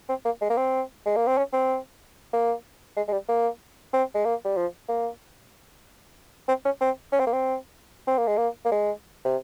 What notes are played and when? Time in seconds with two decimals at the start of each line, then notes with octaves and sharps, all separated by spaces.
0.09 C4
0.25 A#3
0.41 G#3
0.50 A#3
0.57 C4
1.06 G#3
1.16 A#3
1.27 C4
1.38 C#4
1.53 C4
2.33 A#3
2.96 G#3
3.08 G#3
3.12 G3
3.29 A#3
3.93 C4
4.15 G#3
4.25 A#3
4.45 G3
4.57 F3
4.89 A#3
6.48 C4
6.65 C#4
6.81 C4
7.12 C#4
7.20 C4
7.26 A#3
7.33 C4
8.08 C4
8.18 A#3
8.27 G#3
8.37 A#3
8.65 A#3
8.72 G#3
9.25 C3